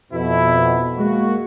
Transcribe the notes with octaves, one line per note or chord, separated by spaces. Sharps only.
F2 B2 E4
G#3 A#3 F#4